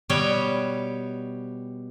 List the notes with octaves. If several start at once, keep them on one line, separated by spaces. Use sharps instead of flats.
B2 G3 B3 G4 C#5 G5